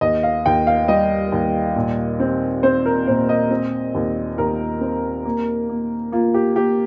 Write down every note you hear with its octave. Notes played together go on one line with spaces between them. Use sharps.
D#2 D#5
F5
D#2 G5
F5
G3 D#5
D#2
A#2
C4
C4 C5
A#4
A#2 C5
D#5
C4
D#2
D#2 A#4
C4
A#3
A#3
A#3 F4
G4
A#3 G4